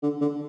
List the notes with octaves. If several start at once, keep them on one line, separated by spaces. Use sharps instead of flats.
D3
D3